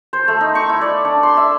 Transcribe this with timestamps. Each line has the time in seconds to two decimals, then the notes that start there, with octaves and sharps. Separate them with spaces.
0.13 C5
0.28 A3
0.41 D#4
0.55 C#6
0.69 E4
0.81 D5
1.05 D4
1.23 C6
1.37 E5